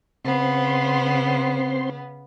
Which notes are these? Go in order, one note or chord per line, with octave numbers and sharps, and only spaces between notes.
C#3 B3 C4 C6